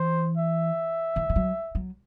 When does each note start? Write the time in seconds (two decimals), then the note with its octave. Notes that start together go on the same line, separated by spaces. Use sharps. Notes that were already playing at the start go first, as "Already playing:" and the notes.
Already playing: E3 C5
0.37 E5
1.16 E3
1.29 E3
1.36 F#3
1.75 F#3